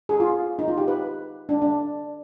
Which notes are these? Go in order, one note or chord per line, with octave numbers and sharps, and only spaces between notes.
G#4
F4
D#4
F4
G4
B4
D4
D4